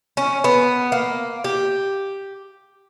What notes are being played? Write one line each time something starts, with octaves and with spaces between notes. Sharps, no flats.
C#4
B3
A#3
G4